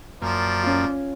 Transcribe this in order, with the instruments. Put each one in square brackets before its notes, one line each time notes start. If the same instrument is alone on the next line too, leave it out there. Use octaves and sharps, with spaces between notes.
[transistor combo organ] F#2 A#3 [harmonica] F3 [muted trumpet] D5
[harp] C#4 F4